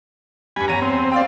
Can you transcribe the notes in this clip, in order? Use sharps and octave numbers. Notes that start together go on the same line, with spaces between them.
G2 G3 G#5 B5
E2 C#5 A#5 D#7
C4
D5 F5 G5